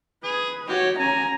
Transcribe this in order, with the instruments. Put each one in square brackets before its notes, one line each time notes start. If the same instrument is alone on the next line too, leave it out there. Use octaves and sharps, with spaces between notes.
[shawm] G#4 [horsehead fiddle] B4
[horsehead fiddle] F#4 C#5 [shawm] G4
[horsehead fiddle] C#4 A#5 [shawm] G#5